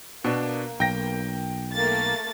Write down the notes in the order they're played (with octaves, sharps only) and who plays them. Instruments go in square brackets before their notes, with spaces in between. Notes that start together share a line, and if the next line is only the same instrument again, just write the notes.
[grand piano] B2 D4 [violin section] A#3
[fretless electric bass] B1 [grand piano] G5 A#6
[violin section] A3 A#3 A6